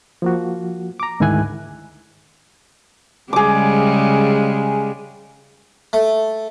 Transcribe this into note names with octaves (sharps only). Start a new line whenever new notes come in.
F3 A#3 F#4
A#5 D6
D2 G#2 D#3 E4 G#5 F#6
C#3 G3 G#3 G#4 D6
A3